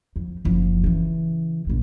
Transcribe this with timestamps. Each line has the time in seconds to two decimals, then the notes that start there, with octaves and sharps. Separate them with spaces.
0.16 F2
0.45 F#1 F3
0.84 C#3 E3
1.67 A#1 C#3